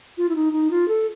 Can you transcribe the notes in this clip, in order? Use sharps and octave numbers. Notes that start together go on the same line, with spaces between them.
F4
E4
D#4
D#4
F4
A4